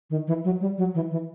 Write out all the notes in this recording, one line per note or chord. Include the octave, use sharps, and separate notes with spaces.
D#3
E3
F#3
G3
F#3
E3
E3